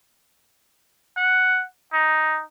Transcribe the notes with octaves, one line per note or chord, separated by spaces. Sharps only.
F#5
D#4